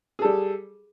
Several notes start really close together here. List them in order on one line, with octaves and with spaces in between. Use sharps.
G#4 A4 G3